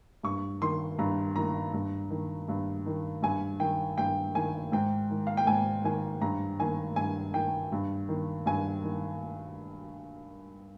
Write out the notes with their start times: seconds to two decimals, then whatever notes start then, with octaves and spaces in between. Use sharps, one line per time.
0.23 G2 C#6
0.61 D#3 C6
0.99 G2 A#5
1.36 D#3 A#5
1.73 G2
2.10 D#3
2.48 G2
2.86 D#3
3.22 G2 G#5
3.60 D#3 G5
3.98 G2 G5
4.35 D#3 G#5
4.72 G#2 G5
5.11 D#3
5.27 F5
5.37 G5
5.47 G#2 G#5
5.84 D#3 G#5
6.22 G2 A#5
6.60 D#3 G#5
6.96 G2 G#5
7.34 D#3 G5
7.72 G2
8.09 D#3
8.46 G2 G#5
8.84 D#3